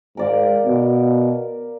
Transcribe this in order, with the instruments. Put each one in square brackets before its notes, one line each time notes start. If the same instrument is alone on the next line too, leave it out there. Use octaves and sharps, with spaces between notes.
[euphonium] G#2 [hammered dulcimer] A#4 D5 F5
[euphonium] B2